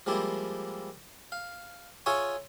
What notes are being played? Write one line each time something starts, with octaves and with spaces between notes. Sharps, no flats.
F3 G3 G#3 A#3 E4
F5
F4 G#4 C#5 E5 G#5 C#6